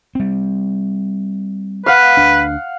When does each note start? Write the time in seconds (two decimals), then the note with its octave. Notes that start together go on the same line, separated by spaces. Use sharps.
0.15 G3 C4
1.86 B4 F5 F#5
2.17 D2 D4